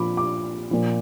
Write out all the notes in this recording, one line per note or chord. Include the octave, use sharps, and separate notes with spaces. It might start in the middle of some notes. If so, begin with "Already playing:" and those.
Already playing: A#2 F3 B5 D6
D6
A#2 F3